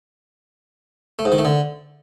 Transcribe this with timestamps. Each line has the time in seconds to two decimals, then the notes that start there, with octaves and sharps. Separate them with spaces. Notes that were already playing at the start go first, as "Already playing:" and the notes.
1.19 A3
1.25 G#2
1.32 D#3
1.38 A3
1.45 D3